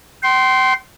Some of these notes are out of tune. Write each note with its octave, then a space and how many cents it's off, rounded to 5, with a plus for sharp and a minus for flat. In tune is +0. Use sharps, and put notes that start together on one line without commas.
G5 -40 C6 +0